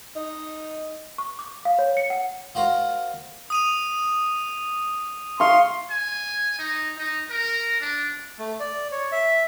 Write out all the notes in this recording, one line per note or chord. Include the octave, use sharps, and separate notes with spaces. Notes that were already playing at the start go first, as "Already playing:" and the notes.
D#4
C#6
D6
F5
C#5
C#7
F#5
F4 F#4 A#4 C5
D#6 D#7 F7
F5 C6 C#6
G#5
D#4
D#4
A#4
D4
A3
D5
C#5
E5